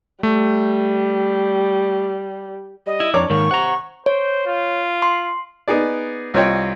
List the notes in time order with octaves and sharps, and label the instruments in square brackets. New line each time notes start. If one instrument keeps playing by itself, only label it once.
[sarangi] G3 [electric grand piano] A3
[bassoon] G3 [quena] D#5
[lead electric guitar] E4
[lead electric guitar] F2 [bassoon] D4 [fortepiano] C#5 D6 [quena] A#5
[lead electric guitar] G#2 D#3 [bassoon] A#3 [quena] C#6
[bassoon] C3 [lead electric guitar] F#5 A#5
[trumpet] C5 [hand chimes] C#5
[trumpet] F4
[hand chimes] C6
[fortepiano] B3 D#4 G#4 D5
C2 C4 F4 C#5 D#5 G5